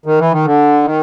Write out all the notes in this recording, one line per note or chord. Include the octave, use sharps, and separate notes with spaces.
D#3
E3
D#3
D3
D#3